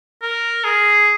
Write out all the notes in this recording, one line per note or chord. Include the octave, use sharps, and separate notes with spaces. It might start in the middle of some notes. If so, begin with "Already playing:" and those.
A#4
G#4